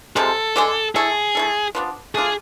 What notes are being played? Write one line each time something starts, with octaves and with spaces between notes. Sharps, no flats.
C3 F3 G#3 A4
D3 G#3 D4 G#4
A3 E4 G#4 A4
A3 E4 A4
F3 B3 D4
A3 D4 F4 G#4